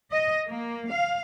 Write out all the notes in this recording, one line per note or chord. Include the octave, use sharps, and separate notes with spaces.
D#5
A#3
F5